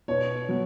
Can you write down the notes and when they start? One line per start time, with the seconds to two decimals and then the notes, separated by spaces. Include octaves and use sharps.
0.08 B2 C#5
0.49 F#3 B3